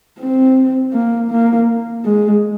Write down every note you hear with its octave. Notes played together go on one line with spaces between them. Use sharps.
C4
A#3
A#3
G#3